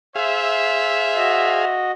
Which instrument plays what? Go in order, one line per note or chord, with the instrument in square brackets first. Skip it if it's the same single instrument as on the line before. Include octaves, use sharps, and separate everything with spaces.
[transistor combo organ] G#4 F5 [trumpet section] C5 E5
[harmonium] F#4 D#5